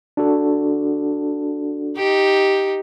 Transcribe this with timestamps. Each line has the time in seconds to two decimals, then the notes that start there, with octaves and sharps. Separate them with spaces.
0.17 D4 F#4 A4
1.97 D#4 G4